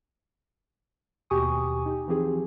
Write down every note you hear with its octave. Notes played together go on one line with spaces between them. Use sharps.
D#2 B2 G4 G#5 C#6 D#6
D#4 G4
E3 F3 C4 G4 G#4